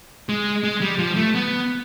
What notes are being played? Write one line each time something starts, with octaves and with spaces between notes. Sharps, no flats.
G#3
G#3
G3
F3
A3
B3